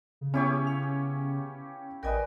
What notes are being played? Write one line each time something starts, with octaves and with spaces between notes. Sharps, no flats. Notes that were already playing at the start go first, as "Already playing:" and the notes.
C#3
B3 C#4 E4 G4 C#5
F5
A1 A#4 B4 D5 D#5 G5 G#5